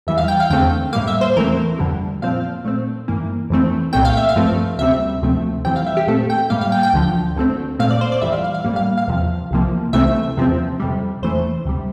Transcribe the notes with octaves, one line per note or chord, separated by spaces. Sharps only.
E2 E3 G3 E5
F5
G5
F5
E2 D3 A3 C4 G5
A2 G3 A#3 F5
E5
C5
E2 E3 A3 C4 A#4
F2 D3 G3
A#2 F3 C4 F5
A#2 A3 C4
G2 E3 A#3
F2 E3 A3 C4
C2 A#2 A3 C4 G5
F5
E5
F5
G2 F3 A3 C4
D2 C3 G3 C4 E5
D2 C3 F3 A3 C4
F2 E3 G3 C4 G5
F5
E5
G4
A#2 A3 C4 A4
G5
A2 G3 A#3 F5
F5
G5
G5
D2 D3 F3
D2 D3 A3 C4
A#2 A3 C4 F5
D5
C5
D5
F2 E3 G3 E5
F5
F5
F5
A2 G3 A#3
F5
F5
E2 C3 F3
C2 C3 F3 A#3
C2 C3 E3 A3 C4 E5
E2 C3 F3 C4
F2 C3 G3
E2 E3 A3 C5
D2 C3 G3